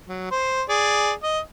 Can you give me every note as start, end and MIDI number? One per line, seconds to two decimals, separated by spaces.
0.07 0.27 54
0.31 0.62 72
0.69 1.12 68
0.69 1.12 74
1.23 1.40 75